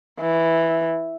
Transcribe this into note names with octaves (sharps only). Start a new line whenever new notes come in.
E3